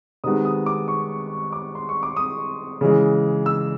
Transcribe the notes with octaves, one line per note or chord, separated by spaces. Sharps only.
C3 D#3 G#3 B3 D#6
D#6
D6
C#6
D6
C6
C#6
D6
D#6
C#3 E3 G#3
E6